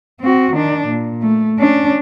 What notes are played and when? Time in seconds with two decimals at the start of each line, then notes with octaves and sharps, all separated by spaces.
0.20 C4 F#4
0.55 D#3 D4
0.88 A#2
1.22 A3
1.59 C#4 D4